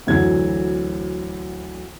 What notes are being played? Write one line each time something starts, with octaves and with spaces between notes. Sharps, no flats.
D2 E3 F#3 G#6